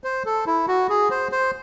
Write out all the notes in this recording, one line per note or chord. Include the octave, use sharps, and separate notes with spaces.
C5
A4
E4
F#4
G#4
C5
C5